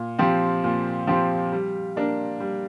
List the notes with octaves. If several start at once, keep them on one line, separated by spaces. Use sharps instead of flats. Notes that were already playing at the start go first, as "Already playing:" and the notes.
Already playing: A#2
F3 C4 G4
A#2
F3 C4 G4
G3
A#3 D4 A#4
G3